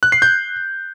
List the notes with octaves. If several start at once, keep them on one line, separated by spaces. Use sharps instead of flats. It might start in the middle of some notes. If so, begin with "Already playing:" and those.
F#6
C7
G6